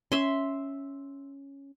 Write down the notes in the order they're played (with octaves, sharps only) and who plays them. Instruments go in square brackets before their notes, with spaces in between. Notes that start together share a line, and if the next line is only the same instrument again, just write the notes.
[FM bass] C#4 [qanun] E5 C6